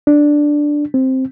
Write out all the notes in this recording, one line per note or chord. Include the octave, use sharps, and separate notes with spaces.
D4
C4